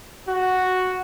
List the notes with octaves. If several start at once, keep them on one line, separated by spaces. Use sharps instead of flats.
F#4